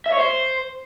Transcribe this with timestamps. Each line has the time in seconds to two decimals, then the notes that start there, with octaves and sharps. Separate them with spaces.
0.06 E5
0.12 C#5
0.19 C5